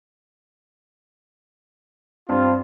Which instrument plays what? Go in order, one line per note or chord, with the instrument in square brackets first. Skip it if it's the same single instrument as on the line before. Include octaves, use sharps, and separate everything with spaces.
[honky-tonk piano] G2 [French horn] C4 [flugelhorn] F4